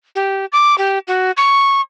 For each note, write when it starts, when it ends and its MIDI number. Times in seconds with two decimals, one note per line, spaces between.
0.15 0.46 67
0.52 0.78 86
0.78 0.99 67
1.08 1.31 66
1.37 1.81 85